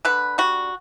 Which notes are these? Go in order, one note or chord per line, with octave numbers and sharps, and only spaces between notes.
D3 B4
G3 F#4